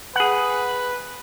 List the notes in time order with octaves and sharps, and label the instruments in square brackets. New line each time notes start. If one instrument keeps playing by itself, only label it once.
[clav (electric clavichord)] G#4 F#5 [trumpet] B4